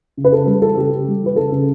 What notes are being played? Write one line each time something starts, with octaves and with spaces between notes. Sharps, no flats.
C#3
B4
C#3 A4
G3 A4
E3 A4
C#3 G4
C#3
G3
E3 B4
C#3 A4
C#3